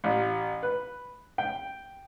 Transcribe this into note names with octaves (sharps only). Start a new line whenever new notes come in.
A1
B4
G5